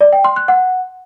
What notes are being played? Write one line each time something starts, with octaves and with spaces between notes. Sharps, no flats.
D5
G5
C6
F#6
F#5